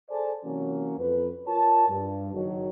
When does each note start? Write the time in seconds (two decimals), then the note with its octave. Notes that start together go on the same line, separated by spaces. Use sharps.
0.10 G#4 A4 C5 D5 G#5 A5
0.44 C3 E3 F#3 A#3 C#4
0.98 F2 B4
1.47 F4 A#4 C#5 A5
1.88 G2
2.33 F#1 D#3 F#3